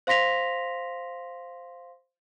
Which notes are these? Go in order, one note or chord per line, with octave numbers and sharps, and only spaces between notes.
C5 F5 C6 A#6 B6 F7